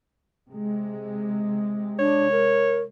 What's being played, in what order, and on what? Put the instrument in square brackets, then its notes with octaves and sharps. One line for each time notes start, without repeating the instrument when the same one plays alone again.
[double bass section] C3 G#3
[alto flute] D4 [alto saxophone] C#5
[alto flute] A#4